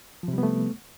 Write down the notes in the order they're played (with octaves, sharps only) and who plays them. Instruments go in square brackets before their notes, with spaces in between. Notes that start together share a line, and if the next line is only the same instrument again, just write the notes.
[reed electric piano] F3
C3
G3
B3
A3